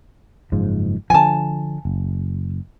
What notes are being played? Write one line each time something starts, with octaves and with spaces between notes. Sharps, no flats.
F#1 G#2 F3
D3 F3 G#5 A5
F#1